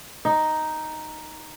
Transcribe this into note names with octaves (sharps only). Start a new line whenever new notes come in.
D#4